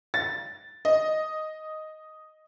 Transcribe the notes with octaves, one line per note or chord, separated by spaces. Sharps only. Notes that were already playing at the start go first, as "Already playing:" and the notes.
A6
D#5